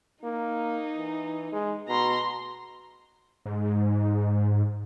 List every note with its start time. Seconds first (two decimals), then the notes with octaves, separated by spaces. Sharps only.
0.24 A#3 D#4
0.97 E3
1.52 G#3
1.88 B2 A#5 C6
3.46 G#2